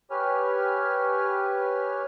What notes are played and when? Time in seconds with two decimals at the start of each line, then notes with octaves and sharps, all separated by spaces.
0.11 G4 B4 C#5 G#5 F6